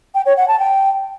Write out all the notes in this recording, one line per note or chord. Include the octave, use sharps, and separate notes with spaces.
G5
C#5
F#5
A5
G5